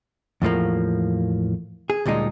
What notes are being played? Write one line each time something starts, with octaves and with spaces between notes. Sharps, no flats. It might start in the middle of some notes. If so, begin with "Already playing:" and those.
E2 A2 F3 A#3
G#4
D2 A#2 G3 G#3 D#4